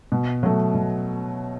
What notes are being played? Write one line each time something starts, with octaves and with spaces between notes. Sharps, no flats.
B2
F#3 A3
B2